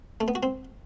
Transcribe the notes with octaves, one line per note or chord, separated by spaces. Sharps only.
A3
B3
F#4
C4